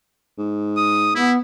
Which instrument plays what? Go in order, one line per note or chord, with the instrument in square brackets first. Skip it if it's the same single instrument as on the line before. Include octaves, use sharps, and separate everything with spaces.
[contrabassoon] G#2
[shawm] D#6
[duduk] B3 [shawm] E4